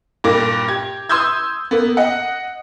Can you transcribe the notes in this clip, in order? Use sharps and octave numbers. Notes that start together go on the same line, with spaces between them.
G2 A#2 A#3 D6 A#6
G4 G#6
C6 D#6 E6 G6 G#6
A#3 B3
D#5 F#5